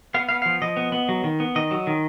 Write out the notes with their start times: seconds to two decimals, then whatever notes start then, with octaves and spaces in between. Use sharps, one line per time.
0.14 B3 F5
0.29 B3 F5
0.42 F3 F5
0.62 F3 D#5
0.77 B3
0.92 B3
1.09 F#3
1.24 D#3
1.40 B3
1.56 D#3 D#5
1.71 F#3
1.87 D#3